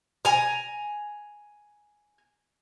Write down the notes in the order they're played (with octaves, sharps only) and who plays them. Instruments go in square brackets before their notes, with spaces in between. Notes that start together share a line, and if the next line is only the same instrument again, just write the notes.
[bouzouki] G#5 A#5